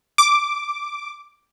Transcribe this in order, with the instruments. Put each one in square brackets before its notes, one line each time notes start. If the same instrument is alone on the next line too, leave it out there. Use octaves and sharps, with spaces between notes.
[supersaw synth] D6